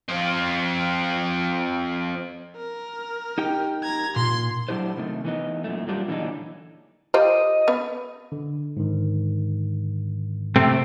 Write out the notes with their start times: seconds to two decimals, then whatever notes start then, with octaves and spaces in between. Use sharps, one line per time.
0.09 F3 C4
2.57 A#4
3.38 D#4 G4 G5
3.83 A#5 G#6
4.16 A#2 C6
4.69 F#3 A3 D4 E4 G4 C5
4.97 C3 D#3 A3
5.25 E3 B3 D#4
5.64 F#2 A#2 A3
5.88 F#3 G3 A#3 D4 F4 G4
6.08 A#2 D3 E3 F#3 D4 D#4
7.14 F4 G4 C5 D#5
7.68 B3
8.32 D3
8.77 G#2 D3 D#3
10.56 C3 A3 C4